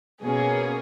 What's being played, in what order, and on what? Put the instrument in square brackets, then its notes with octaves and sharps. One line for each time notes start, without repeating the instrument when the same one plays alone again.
[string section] B2 A#3 C#4 G#4